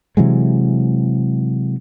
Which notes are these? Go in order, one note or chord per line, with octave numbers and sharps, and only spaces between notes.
C3 E3 F#3 G#3